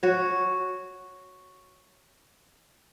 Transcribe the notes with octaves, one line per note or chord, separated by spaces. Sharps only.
F#4 C#5